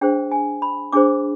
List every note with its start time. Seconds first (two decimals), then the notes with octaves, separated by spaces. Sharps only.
0.01 D4 G#4 C5 G5
0.32 G#5
0.62 B5
0.92 D4 G#4 C5 D6